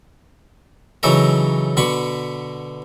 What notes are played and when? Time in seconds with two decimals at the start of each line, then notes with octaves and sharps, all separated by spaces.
1.03 C#3 E3 F#3 D#4 A4 A#4
1.77 B2 D3 B5 C#6